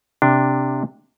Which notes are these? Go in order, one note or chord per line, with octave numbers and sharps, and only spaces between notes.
C3 D4